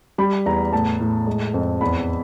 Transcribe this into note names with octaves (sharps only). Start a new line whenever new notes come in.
G3 B5
E2 A#5
A2 A5
A2
G#3
F2
E2 B5